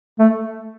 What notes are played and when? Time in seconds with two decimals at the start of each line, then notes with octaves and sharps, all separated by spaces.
0.19 A3